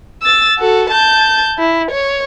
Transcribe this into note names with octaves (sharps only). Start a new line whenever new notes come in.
E6 A6
F#4 A4
A5 G6
E4
C#5